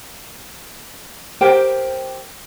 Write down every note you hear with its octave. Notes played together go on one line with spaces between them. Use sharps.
G4 A#4 C5 G5